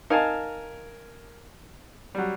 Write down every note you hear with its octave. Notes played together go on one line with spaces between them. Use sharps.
D#4 A#4 F5 G#5 A5
F#3 G3